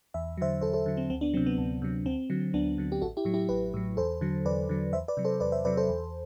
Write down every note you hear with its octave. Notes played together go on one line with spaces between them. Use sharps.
E2 E5
D3 F#3 C5 E5
E2 A4 C5
A4 C5
D3 F#3
C4
D2 C4
B3 D4
C3 F#3 C4
B3
D2
C3 F#3
D2 C4
D3 F#3
D2 B3 D4
D3 F#3
G4
A1 F#4 A4
E4 G4
A2 F#3
E4 G4
A1 G4 B4
A2 F#3
E2 A4 C5
D3 F#3
E2 B4 D5
D3 F#3
E2 C5 E5
B4 D5
C3 F#3
A4 C5
E2 B4 D5
C5 E5
C3 F#3 B4 D5
A4 C5
E2